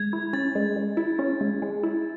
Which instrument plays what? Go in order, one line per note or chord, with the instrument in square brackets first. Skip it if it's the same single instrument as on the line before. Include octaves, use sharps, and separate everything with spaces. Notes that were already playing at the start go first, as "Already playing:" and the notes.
Already playing: [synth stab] G#3 [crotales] G#6
[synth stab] E4
[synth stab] C#4 [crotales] A6
[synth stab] G#3
G#3
E4
C#4
G#3
G#3
E4